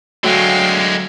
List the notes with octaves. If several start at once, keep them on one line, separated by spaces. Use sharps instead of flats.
D3 F#3 G#3 A3 F5 G5